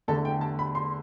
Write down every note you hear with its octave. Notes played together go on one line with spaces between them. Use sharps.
E2 D3 A3 A4
G5
A5
B5
C6